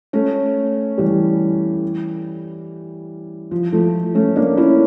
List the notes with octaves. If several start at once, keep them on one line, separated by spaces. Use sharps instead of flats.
A3 C#4
E3 G3
F3
F3 A3
A3 C#4
A#3 D4
C#4 E4